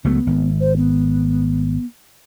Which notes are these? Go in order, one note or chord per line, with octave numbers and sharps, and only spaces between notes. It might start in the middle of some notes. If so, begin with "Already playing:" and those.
C#2 F#3 A3 B3
G#1
C5
B3